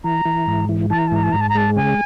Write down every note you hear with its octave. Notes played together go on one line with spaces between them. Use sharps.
E3 A#5
E3
G#2
E3
E3 A5
A#5
A5
G#2 A#5
A5
G#2 A#5
A5
A#5
G#3 A5
C#3 G#5